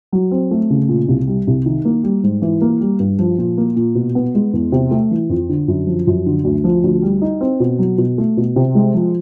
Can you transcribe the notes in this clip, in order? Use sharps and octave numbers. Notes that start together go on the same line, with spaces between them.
F#3
C4
A3
C#3
A#2
C2
G3
C2
D#3
A#3
G3
G#2
E3
A#3
G3
G2
F3
A#2
A#3
A#2
B2
B3
G#3
E2
C3
A3
E3
F2
D3
F#2
F3
F#2
D3
D2
F3
D2
G3
D#4
C4
B2
F#3
B2
A3
B2
C3
G#3
F3